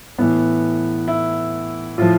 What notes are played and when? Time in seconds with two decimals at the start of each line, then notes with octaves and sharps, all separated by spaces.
0.18 A2 E3 B3
1.08 E4
1.98 A2 F3 F4